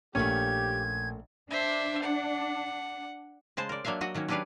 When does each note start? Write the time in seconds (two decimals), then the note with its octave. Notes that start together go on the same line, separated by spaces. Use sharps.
0.15 A#1 A3 A#3 C#4 G4 G#6
1.50 D4 C5 E5
2.02 F#5
3.57 C#3 G#3 C5 A5
3.69 A#4 D5
3.85 F#3 A#3 D4 E5 F5
4.01 F#3 F#4 D#5
4.14 D#3 F#3 A#3 C#4
4.28 F#3 C#4 D4 G4 B4 F5